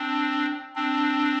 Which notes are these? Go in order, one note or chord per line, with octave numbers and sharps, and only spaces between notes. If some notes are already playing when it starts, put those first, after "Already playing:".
Already playing: C4 D4
C4 D4